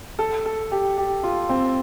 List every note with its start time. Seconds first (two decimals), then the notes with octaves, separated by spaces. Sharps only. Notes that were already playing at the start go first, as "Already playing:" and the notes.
0.19 A4
0.46 A4
0.71 G4
0.97 G4
1.24 F4
1.49 C4